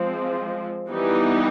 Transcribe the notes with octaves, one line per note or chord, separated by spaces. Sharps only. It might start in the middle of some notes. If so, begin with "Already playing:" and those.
Already playing: F3 G#3 C4
E3 G3 B3 D#4 G4